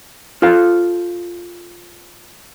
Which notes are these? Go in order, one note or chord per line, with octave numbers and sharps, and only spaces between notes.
F4 A4 C5 F5